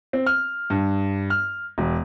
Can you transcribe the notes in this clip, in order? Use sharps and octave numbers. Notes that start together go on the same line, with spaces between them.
C4
F6
G2
F6
E1